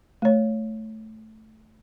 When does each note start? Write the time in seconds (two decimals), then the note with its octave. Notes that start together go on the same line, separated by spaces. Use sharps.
0.22 A3 C#5